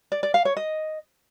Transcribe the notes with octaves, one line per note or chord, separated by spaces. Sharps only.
D5
D5
F5
C#5
D#5